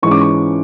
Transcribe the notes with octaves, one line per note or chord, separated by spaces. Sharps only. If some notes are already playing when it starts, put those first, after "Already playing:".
G#2 E3 G#3 C#4 C#6
D6
C#6